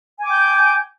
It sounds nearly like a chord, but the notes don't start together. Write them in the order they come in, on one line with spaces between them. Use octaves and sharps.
G#5 D6 G5 G6